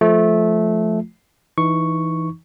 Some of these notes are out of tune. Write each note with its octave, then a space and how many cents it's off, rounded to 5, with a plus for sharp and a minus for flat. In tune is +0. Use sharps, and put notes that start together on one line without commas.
F3 +0 A3 -15 F4 +0
E3 +0 D#4 +10 C#6 +0